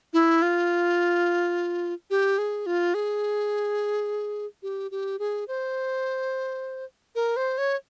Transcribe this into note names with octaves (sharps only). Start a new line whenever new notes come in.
E4
F4
G4
G#4
F4
G#4
G4
G4
G#4
C5
A#4
C5
C#5